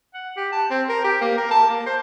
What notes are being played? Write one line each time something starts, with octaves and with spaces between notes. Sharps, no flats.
F#5
G4
A5
C4
A#4
G4
A#3
A#4
A5
A#3
C5